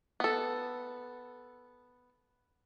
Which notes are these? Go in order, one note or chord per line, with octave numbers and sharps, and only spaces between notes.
B3 A4